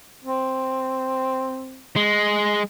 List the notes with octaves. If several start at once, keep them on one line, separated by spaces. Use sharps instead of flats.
C4
G#3